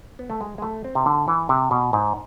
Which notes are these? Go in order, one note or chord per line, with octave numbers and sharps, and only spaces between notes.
B3
A3
G#3
G#3
A3
C4
C3
D3
E3
C3
B2
G#2